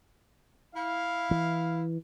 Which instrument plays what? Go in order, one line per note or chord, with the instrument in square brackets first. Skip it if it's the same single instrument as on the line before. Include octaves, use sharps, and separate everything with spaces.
[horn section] E4 F5
[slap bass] E3